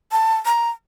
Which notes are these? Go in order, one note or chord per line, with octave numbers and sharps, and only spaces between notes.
A5
A#5